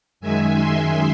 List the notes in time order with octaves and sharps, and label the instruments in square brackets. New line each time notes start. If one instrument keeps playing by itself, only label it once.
[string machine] F#2 D#3 G#3 E5 G#5
G#5 C6